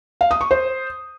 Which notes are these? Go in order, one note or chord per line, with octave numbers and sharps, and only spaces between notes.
F5
D#6
C#6
C5